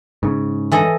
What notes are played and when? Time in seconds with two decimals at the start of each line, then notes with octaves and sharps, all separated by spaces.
0.23 G#2 C#3
0.72 E3 A4 D#5